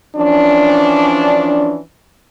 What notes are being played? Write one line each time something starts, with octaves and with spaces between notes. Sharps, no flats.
E3 F3 C#4 D4